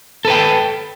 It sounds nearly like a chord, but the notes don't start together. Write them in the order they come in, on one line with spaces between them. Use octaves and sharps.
A4 B4 G5